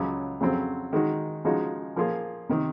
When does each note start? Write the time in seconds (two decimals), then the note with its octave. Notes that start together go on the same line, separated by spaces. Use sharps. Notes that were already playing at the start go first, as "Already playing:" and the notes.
Already playing: C#2 C#3 F#3
0.40 F2 C#3 F#3 C4
0.93 D#3 G#3 D#4 F#4
1.44 C#3 F3 G#3 D#4 F#4
1.96 F3 A#3 F4 G#4
2.49 C3 D#3